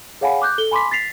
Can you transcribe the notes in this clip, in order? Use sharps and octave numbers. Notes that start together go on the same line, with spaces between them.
G#4 C#5 F5 F#5 G#5 B5
D6 F#6 G6
A4 G7
G#5 B5 C6 D6 B6
A6 B6 C7 F7